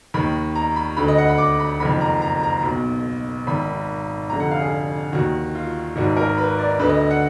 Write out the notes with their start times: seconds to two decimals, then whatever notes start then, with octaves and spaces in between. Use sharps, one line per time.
0.14 D#2 D#3 B5
0.55 A#5
0.76 B5
0.97 D2 D3 B5
1.08 D#5
1.18 F#5
1.29 B5
1.38 D6
1.59 B5
1.80 F#1 F2 D#3 B5
2.01 A#5
2.22 A#5
2.43 A#5
2.63 B1 B2
3.47 G#1 G#2 D#3 B5
4.29 F1 F2 D3 A#5
4.40 F#5
4.51 F5
4.60 G#4
5.13 D#2 D#3 F#4
5.55 F4
5.96 G#1 G#2 D#3 F#4
6.17 A#4
6.38 B4
6.59 D5
6.79 D2 D3 B4
6.89 D#5
7.11 F#5